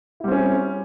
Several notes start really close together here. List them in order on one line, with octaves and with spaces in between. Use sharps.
E4 G3 C4 C#4